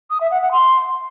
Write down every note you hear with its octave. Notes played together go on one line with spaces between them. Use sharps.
D#6
E5
F#5
F#5
C6